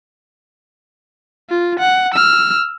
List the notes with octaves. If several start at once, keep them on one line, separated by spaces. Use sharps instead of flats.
F4
F#5
E6 F6